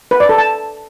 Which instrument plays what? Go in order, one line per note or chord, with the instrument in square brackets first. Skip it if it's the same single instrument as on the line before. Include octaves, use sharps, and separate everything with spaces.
[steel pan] B4
D5
A4
A5